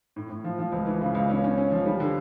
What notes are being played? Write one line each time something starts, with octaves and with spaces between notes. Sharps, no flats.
A2
A2
F3
F3
C#2
E3
C#3
C#2
C#4
C#4
C#4
F3
G3
D3